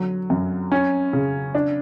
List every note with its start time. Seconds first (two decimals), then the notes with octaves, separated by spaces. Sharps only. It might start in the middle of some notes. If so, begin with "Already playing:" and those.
Already playing: D3 F#3
0.30 F#2
0.72 C#4
1.13 C#3
1.55 D4